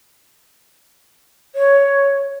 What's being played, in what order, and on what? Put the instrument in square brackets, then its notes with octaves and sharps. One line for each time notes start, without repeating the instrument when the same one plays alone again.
[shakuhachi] C#5